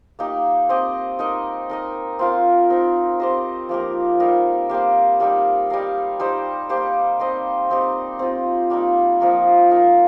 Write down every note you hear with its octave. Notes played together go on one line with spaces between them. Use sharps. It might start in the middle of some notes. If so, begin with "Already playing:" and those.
A#3 D#4 G4
C4 G4 D#5
D#4 A#4 D#5
D#4 A#4 D#5
C4 F4 A#4
C4 D#4 A#4
C4 G4 C5 D#5
F3 A#3 G4 A#4
G3 D#4 A#4 F5
A#3 G4 C5 F5
G3 A#3 D#4 G4
G3 D#4 A#4 F5
G3 D#4 G4 C5
A#3 G4 C5
C4 D#4 C5 D#5
C4 D#4 G4
C4 F4 D#5
G3 A#3 D#4
F3 A#3 D#4
A#3 D#4 A#4